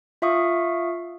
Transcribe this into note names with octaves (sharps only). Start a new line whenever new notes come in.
F4 E5 F5 C#6 D#6